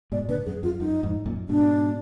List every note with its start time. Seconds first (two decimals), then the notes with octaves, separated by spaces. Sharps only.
0.12 G#2 B2 D5
0.28 A#2 D3 B4
0.46 F#2 G#4
0.63 F#2 F4
0.80 F#2 D#4
1.03 F2 G#2
1.26 F#2 A#2
1.49 G#2 B2 D4